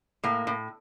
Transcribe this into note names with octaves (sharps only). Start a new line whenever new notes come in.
A2 A#3
A2